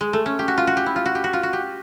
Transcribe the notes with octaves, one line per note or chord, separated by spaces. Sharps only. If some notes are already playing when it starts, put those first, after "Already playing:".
G#3
A3
C#4
G4
F#4
F4
F#4
G4
E4
F4
F#4
G4
F#4
F4
F#4
G4